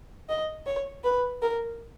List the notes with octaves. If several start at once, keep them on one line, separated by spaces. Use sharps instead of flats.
D#5
C#5
B4
A#4